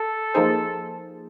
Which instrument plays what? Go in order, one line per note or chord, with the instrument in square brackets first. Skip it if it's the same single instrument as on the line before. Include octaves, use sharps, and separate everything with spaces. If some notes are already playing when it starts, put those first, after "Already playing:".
Already playing: [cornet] A4
[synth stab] F3 A#3 D#4 G#4 C5